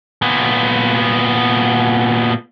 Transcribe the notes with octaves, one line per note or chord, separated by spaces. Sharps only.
A#2 B3